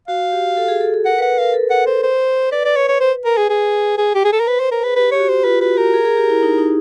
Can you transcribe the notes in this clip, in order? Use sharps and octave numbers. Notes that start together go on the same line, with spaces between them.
F#4 F5
G4
A4
G#4
A4
A4
A#4 F#5
B4
F#5
B4
A#4 F5
A4
F#5
C5
C5
B4 D5
D5
C#5
C#5
C5
A#4
G#4
G#4
G#4
G4
G#4
A4
A#4
B4 C5
B4 C5
A#4
G#4 B4
G4 B4
G4 C#5
F#4
C5
F4 B4
F#4 B4
G4 A#4
G#4
G#4
G4
E4
D#4
D#4